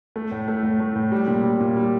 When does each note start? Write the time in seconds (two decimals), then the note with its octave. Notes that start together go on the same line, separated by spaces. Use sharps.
0.16 A3
0.31 A2
0.48 A3
0.63 A2
0.80 A3
0.96 A2
1.12 G3
1.28 A#2
1.44 G3
1.60 A#2
1.77 G3